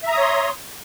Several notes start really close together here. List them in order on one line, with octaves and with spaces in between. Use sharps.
E5 A#5 D#6 C#5 C6